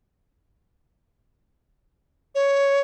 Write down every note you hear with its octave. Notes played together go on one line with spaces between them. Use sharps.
C#5